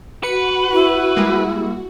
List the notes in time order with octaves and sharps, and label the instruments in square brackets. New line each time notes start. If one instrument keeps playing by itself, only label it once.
[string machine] F#4 [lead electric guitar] B4 [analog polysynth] C#7
[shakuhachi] E4
[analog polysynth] G3 G#3 A#3